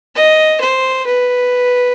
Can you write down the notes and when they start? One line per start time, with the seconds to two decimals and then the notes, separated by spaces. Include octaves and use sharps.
0.15 D#5
0.61 C5
1.06 B4